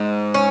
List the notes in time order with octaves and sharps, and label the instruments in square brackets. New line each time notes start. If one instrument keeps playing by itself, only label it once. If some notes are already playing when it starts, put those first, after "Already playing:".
Already playing: [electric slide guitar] G#2
[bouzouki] C#4